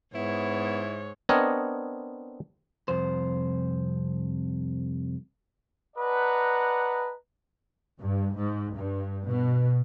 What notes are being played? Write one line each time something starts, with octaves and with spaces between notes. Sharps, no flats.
G#2 B3 E4 C#5
B3 C4 D4 A#4 C#5 D#5
C2 F2 C5
B4 D5 D#5 F#5 A5 A#5
G2
G#2
G2
B2